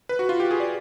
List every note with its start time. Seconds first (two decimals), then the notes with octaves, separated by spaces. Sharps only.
0.09 B4
0.19 F#4
0.29 F4
0.40 G4
0.51 G#4
0.60 D5